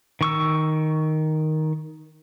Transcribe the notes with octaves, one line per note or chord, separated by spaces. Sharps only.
D#3 C#6 E6